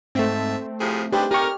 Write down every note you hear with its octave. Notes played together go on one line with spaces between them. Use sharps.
G#2 A3 C4 E5 A5
A2 C3 F3 G#4
G#2 D4 G4 B4 C5
D#4 G4 A#4 C#6 F6